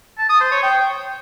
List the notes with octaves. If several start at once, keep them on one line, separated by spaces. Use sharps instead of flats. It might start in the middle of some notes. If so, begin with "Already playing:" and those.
A5
D#6
C5
C#5
G5